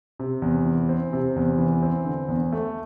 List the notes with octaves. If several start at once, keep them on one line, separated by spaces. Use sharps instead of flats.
C3
E2
E3
C4
C3
E2
E3
C4
D3
E2
A3